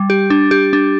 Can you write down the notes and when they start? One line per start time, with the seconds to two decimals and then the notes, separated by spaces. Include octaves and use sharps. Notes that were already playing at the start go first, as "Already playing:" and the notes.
Already playing: G3
0.10 G4
0.30 D4
0.51 G4
0.73 D4